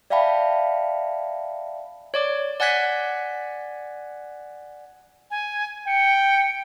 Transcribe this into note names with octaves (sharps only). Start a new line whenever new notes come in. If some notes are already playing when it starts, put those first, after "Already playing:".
D5 E5 F5 G5 A5 B5
C#5 D5 D6
D5 F#5 G#5 F#6 G#6 B6
G#5
G5 C#7